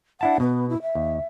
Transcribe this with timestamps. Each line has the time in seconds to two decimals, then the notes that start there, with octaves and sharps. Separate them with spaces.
0.21 D4 E4 F#5 A5
0.40 B2 B3
0.69 E4
0.82 E5
0.95 D#2